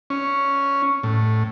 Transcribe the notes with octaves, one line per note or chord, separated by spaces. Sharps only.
C#4
A2